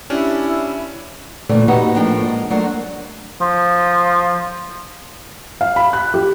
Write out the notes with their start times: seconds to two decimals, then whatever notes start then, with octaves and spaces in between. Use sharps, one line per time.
0.10 C#4 D4 E4 G4
1.49 A#2 D3 E3 A3 C4
1.68 B3 C4 D#4 F#4 G4 B4
1.95 A2 F3 A3 A#3 D4 G5
2.25 G#3 A#3
2.50 F#3 A3 D4 F#4 A#4 C5
3.41 F3
5.61 F5
5.76 B5
5.93 F#6
6.14 G4